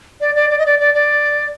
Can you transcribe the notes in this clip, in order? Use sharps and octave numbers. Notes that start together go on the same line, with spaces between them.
D5
D5
D5
D#5
D5
D5
D5